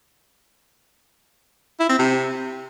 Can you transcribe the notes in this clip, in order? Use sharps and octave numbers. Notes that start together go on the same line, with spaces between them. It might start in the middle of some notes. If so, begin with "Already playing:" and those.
E4
C4
C3